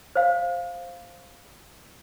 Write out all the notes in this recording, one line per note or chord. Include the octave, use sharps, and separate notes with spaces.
C5 F5